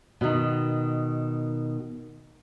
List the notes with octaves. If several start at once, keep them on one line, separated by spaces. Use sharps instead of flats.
B2 D#3